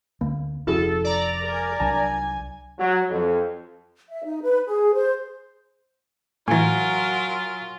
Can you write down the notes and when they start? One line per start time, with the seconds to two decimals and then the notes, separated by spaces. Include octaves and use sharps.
0.21 D2 A#3
0.67 F1 F3 C#4 E4 F#4 G#4 A4
1.04 D5 A#5
1.44 A#4 G#5
1.80 C2 F#3 D4 G#5 A5
2.79 F#3
3.10 F2
4.10 E5
4.24 D#4
4.42 B4
4.68 G#4
4.94 C5
6.48 A2 E3 F#3 F4 A#4 G#5 A#5